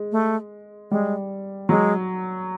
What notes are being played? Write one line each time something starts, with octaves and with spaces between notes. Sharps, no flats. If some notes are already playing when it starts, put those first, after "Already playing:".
Already playing: G#3
A3
G3 G#3
F#3 G#3